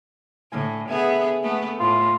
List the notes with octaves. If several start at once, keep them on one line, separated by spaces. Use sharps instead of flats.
A2 D3 G#5
B3 G#4 A4 E5 G#5
A3 B3
A2 F4